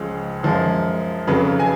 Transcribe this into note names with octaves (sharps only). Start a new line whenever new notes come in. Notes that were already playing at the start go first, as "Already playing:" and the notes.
Already playing: C#2 C#3 F3 G#3
F#2 F3 G#3
F2 C#3 F#3 B4
G#5